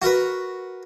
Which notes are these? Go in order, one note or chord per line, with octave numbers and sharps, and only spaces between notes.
F#4 A#4 B4